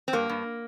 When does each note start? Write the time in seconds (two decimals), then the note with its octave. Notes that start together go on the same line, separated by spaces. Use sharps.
0.08 C4
0.13 G2 A#3
0.29 G2